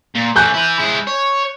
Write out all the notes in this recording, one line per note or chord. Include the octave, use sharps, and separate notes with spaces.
A#2
E3 A3 G#5 F#6 G6
E4 B4
G#3 E4
C#5